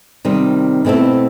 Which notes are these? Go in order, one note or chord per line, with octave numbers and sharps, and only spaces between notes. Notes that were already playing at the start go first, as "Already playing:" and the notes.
C3 D#3 G3 C4
B2 A3 C4 E4 A4